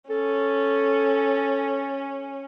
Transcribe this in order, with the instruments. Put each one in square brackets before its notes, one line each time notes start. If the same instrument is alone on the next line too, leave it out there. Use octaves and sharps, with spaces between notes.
[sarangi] C#4 [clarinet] A4